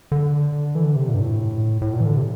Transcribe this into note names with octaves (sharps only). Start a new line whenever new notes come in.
D3
E3
D3
C3
A#2
G2
A2
A2
A#2
E3
D3
C3